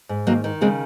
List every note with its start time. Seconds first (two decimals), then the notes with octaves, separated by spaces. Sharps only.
0.09 G#2
0.26 D#3 F#3 A#3
0.44 D#3
0.61 C#3 G#3 C4